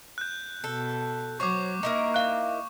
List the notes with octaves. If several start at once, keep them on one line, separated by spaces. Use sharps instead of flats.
F#6 G6
B2 A4
F#3 C5 C#5 C#6 D6
A#3 D#4 E4 A#4
F5 F#6